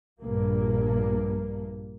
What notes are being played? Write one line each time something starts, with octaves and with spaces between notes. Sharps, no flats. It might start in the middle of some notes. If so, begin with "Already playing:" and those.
A#1 G2 A#3